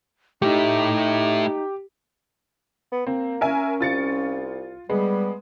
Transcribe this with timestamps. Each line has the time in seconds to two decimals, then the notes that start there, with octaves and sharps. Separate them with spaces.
0.42 A3 D#4 E4 G4
2.92 B3
3.07 A#3 C4
3.41 C#4 A#4 E5 G#5
3.80 C2 F4 A6 C#7
4.90 G3 G#3 B3